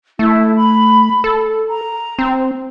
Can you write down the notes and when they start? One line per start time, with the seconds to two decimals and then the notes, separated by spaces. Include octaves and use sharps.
0.19 A3 E4
0.56 B5
1.24 A4
1.69 A#5
2.19 C4